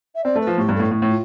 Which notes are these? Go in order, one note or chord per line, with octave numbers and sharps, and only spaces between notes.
E5
C4 D5
A3 B4
F3
A2 G4
G2
A4
A2
A2
A2
F4